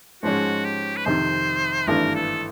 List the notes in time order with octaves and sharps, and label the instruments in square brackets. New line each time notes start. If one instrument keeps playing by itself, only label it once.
[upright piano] G#2 F3 G#3 C#4 [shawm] F#4
[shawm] G4
B4
[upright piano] F2 C3 D#3 [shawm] C5
[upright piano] G#1 G2 E3 A3 D4 [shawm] A#4
[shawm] A4